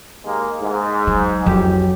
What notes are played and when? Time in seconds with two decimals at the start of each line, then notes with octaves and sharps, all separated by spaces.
0.24 D#2 G#3 A#3
0.63 G#2
1.07 F#3
1.46 A1 F2 F#3 G4